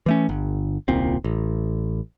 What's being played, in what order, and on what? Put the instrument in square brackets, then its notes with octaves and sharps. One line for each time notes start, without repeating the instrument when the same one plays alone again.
[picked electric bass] E3 A3 C#4
G1
D#1 C2 A#2 C4
A1